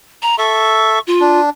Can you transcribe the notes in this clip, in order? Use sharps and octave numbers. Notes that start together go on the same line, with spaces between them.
A#5
A4 E5 C#6
F4
D4